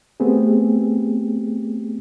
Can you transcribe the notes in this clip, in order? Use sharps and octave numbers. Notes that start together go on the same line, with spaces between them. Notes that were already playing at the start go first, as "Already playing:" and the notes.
A3 B3 C4 G4 G#4